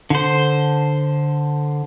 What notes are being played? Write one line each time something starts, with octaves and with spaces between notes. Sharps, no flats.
D3 C5